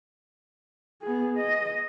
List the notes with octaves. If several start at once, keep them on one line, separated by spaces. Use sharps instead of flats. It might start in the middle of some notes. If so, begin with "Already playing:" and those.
B3 G#4
D#5